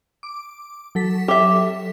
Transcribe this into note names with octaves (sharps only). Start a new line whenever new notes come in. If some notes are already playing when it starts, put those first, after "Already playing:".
D6
F#3 A4 B6
G4 E5